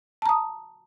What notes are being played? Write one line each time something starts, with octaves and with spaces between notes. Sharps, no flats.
A5 A#5 D#6